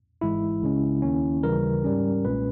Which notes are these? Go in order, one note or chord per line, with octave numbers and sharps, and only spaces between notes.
G#1 G#2 E3 G#3 E4
C#2 C#3 G#3 C#4
D#2 D#3 A#3 C#4
D#2 C#3 E3 G3 A#4
G#2 G3 C#4
B1 A#2 G#3 C#4 B4